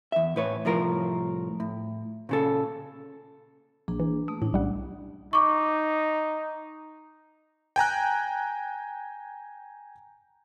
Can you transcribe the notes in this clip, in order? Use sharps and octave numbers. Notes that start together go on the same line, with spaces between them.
E2 E5
A2 B4 C#5
C2 A2 F3 A#4
A2
A#2 C#3 A4
A#1 A#3 D4 G#4
E3
A3 D#6
A2 C#4 D4
B1 G3 F#5
D#4 C#6 D6
G5 G#5 A#5 F#6